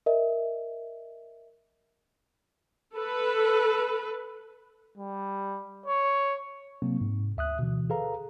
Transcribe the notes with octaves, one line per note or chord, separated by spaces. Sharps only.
A#4 D#5 E5
A4 B4
G3
C#5
C3 F#3 A#3 C4
G#2
D2 E5 D#6 F#6
B2 D3 E3
G#4 A4 B4 F5 A#5